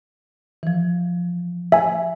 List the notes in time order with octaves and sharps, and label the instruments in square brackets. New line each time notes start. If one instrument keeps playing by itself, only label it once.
[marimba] E3 F3
[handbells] E5 G#5